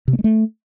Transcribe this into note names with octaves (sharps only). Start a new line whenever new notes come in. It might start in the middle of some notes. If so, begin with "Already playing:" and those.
C3
A#3
G#3
A3